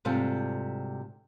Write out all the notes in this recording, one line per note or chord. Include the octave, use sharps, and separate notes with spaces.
D2 G#2 C3 G3 F4 A4